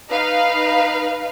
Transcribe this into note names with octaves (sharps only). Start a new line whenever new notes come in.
D#4 B4 F5